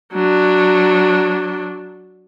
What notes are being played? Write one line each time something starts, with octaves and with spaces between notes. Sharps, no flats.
F#3 D4